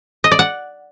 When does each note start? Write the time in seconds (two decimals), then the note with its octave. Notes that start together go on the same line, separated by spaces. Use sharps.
0.24 D#5
0.32 D5
0.39 F#5